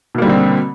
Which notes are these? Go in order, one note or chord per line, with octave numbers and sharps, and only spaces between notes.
B2 D3 G3 A#3 C4